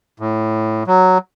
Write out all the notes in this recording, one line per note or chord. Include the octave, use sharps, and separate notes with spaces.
A2
F#3